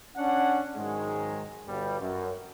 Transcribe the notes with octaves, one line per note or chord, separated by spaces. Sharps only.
C#4 D4 F#5
G#2 D#3 F#3 G#3
G1 G2 B2 G3
F#2